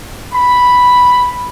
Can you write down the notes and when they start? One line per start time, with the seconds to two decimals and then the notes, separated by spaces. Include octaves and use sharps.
0.34 B5